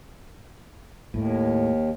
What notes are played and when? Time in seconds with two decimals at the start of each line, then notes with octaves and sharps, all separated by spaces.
1.14 D#2 A2